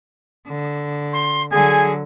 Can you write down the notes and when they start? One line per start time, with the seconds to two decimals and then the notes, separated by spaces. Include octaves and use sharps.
0.47 D3
1.13 C6
1.52 D3 F#3 G#4 G#5